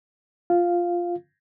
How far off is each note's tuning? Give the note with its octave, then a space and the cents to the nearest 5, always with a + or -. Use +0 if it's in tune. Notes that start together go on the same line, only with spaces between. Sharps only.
F4 +0 F5 +0